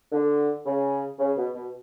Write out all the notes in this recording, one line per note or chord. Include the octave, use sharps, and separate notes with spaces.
D3
C#3
C#3
B2
B2